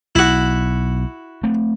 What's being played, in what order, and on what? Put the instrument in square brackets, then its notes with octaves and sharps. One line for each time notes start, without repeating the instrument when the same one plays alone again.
[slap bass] B1 [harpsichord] E4 F#4
[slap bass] A3 C4